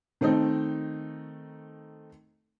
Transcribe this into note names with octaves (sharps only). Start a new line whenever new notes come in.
D#3 A3 C4 D#4